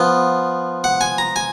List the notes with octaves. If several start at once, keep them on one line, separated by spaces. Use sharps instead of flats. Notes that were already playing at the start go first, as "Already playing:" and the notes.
Already playing: F3 B3
F#5
G#5
A#5
G#5